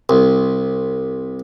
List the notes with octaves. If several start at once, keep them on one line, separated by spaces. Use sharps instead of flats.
C2